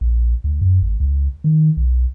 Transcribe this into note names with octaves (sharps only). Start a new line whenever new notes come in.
A#1
D2
F#2
G#1
C#2
D#3
B1